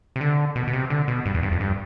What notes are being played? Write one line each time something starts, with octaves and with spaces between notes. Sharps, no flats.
C3
D3
B2
B2
C3
D3
B2
G2
E2
G2
F2
G2